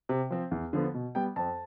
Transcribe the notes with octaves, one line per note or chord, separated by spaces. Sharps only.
C3
F3 C4
E2
D3 F3 B3
B2
G3 B3 G5
F2 A5